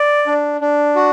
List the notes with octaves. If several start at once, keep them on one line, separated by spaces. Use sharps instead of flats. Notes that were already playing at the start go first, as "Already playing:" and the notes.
Already playing: D5
D4
D4
F#4